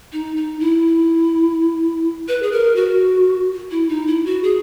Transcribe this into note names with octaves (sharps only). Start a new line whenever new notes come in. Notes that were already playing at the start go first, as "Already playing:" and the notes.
D#4
D#4
E4
B4
G#4
A#4
F#4
E4
D#4
E4
F#4
G#4